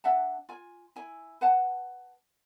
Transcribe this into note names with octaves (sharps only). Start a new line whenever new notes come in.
D4 E5 F#5 A5
F4 G#5
E4 G#5
B4 F#5 A5